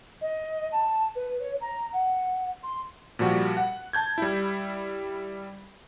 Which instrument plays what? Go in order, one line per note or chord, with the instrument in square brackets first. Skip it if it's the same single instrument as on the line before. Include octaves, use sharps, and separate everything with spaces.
[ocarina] D#5
A5
B4
C#5
A#5
F#5
C6
[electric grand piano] A#2 F3 G3 F#4
F#5
A5 G6 G#6
G3 E4